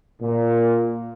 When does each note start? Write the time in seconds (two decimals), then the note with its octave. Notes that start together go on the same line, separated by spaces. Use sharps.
0.21 A#2